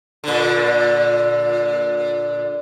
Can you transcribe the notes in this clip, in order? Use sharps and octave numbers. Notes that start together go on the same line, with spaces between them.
A#2 D3